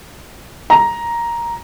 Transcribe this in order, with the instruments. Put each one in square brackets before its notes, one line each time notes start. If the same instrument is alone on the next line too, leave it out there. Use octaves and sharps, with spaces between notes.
[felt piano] A#5